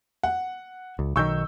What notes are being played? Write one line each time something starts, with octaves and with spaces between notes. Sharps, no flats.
F#5
C#2
B1 D#3 C#6 E6 G6